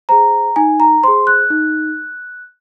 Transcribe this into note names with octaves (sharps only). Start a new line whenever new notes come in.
G#4 C5 A#5
D#4 G#5
A#5
G#4 C5 C6
F#6
D#4